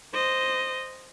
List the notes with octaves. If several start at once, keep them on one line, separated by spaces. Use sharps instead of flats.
C5 D#5